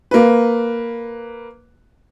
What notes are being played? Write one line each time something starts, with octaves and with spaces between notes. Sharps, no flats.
A#3 B4